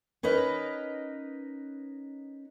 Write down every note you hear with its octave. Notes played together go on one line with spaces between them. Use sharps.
C#4 D#4 A#4 B4 D#5